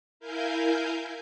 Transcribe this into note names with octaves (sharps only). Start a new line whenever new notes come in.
E4 A#4 F5 G#5 G6